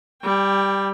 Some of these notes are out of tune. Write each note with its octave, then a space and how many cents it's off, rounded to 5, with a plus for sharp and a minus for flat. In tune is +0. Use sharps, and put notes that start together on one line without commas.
G3 +0 G5 +25